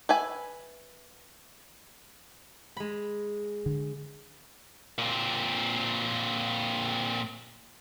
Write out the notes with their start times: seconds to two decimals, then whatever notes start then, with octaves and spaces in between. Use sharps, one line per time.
0.09 B4 E5 G#5
2.77 G#3 B5
3.66 D3
4.98 A#2 C4